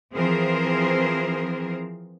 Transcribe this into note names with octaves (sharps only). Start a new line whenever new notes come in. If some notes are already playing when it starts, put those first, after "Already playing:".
E3 F3 C4 G#4 A#4 C5